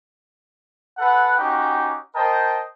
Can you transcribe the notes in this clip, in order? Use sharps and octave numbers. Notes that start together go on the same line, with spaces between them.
A4 B4 F#5
C#4 D#4 F#4 G4 G5
A#4 C5 D#5 G5 A5